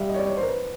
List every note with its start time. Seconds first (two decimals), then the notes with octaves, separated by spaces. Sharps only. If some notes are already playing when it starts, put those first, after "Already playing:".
Already playing: G3 E5 F5
0.09 D#5
0.14 C#5
0.19 D5
0.27 C#5
0.37 C5
0.42 A#4
0.47 B4